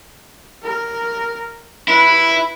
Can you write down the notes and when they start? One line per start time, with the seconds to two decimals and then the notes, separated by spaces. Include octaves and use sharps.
0.63 A#4
1.88 E4 B4